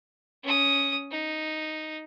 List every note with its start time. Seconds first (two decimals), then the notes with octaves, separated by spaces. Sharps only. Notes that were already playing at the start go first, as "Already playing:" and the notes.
0.44 C#4 D#6
1.11 D#4